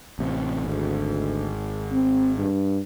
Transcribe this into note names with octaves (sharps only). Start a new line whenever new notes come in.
A1 C3
G#1 D2
C4
G2